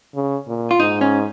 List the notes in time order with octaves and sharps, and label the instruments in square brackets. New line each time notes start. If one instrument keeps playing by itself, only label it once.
[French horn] C#3
A#2
[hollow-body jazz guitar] F4
[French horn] G#2 [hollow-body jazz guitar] D#4
[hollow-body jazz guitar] C#4